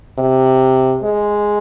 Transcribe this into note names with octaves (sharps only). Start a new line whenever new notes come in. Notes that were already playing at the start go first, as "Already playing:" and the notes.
C3
G#3